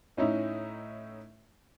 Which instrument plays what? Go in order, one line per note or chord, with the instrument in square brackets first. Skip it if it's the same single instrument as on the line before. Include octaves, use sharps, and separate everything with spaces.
[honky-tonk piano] A2 C#4 D#4 E4